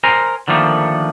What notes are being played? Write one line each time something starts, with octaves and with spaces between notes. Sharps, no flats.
A#4 C5 G#5 A#5
D3 D#3 F3 A3 A#3